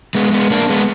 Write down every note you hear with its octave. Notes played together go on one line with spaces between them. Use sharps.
G#3 B3
G#3 B3
A#3 D4
G#3 B3